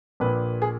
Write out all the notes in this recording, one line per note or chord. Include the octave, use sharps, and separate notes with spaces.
A#1 A#2 B4
G#4